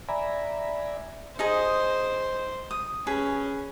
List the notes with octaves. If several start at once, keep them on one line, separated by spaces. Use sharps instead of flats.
D5 E5 G#5 A#5 B5
D#4 G#4 C5 D#5
D#6
C#4 G#4 B4